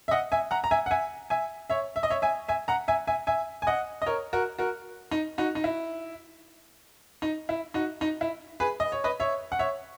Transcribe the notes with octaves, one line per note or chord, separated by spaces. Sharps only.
E5
D#5 F#5
E5 G#5
F#5 A#5
A#5
E5 G#5
F#5
E5 G#5
E5 G#5
C#5 E5
E5
D#5
C#5 E5
E5 G#5
E5 G#5
F#5 A#5
E5 G#5
E5 G#5
E5 G#5
G#5
D#5 F#5
D#5
A#4 C#5
F#4 A#4
F#4 A#4
D#4
D#4 F#4
D#4
E4
D#4
E4
D#4 F#4
D#4
E4
G#4 B4
D#5
C#5
B4 D#5
C#5 E5
F#5
C#5 E5